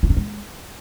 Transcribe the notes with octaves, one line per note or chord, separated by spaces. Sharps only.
E4
D#4
G#3